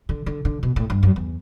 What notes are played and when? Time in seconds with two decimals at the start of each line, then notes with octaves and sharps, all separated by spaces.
0.09 D3
0.26 D3
0.45 D3
0.63 B2
0.76 A2
0.90 G2
1.03 F#2
1.16 E2